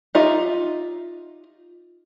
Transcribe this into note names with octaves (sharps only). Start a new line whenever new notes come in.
D#4 F4 G4 D#5 E5